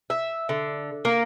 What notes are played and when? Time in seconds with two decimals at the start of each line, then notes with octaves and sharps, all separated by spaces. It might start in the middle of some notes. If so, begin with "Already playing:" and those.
0.10 E5
0.49 D3
1.05 A#3